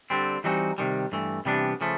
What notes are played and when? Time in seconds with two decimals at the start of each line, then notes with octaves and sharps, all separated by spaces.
0.10 D3 G3 C4
0.44 E3 G3 C4 D#4 F#4
0.78 C3 D#3 G3
1.12 G2 E3 A3
1.45 C3 E3 G3 B3 D4
1.81 C#3 F3 A3